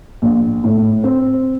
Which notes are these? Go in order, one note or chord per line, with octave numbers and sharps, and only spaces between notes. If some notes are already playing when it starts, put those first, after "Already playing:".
A#1
A2
C4